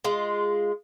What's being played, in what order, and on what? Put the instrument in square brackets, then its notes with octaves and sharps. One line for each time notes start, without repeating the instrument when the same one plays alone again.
[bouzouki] G#3 F4